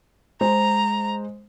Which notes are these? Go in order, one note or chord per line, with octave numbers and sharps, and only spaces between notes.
G#3 C5 A#5